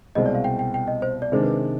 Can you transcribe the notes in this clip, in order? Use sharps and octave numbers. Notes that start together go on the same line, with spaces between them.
C2 B2 G#3 C4 D#5
D5
F5
G5
G5
G5
D#5
C5
D5
C3 D#3 G#3 D4 C5
B4
C5